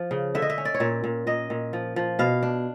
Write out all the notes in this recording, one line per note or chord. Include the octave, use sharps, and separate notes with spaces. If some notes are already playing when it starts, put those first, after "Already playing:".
Already playing: F3
C#3
D3 E5
D#5
E5
C#4
D5
C#5
A#2 D5
A#2
A#2 D#5
A#2
F3
F3
B2 F5
D4